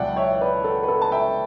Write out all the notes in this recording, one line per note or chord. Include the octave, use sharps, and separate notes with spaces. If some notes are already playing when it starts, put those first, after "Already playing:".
Already playing: C#2 B2 F#3 D5 E5 F#5 G5 A5
C#5 E5
B4 D5
A4
B4
A4
A5
E5 G5